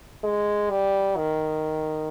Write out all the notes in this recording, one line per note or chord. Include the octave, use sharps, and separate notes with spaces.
G#3
G3
D#3